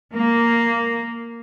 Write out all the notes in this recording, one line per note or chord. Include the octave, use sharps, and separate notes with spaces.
A#3